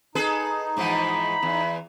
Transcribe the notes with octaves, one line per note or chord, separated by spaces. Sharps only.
D#4 G#4 A4 B4
G#2 E3 F3 B5
E2